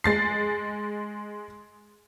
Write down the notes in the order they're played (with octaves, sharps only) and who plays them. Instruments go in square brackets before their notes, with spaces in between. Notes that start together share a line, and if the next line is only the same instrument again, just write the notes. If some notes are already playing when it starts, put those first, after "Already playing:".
[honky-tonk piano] G#3 A6 C7